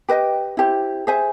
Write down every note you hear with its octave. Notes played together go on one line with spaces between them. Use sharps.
G4 B4 D#5 G5
E4 G4 C5
G#4 C5 E5 G#5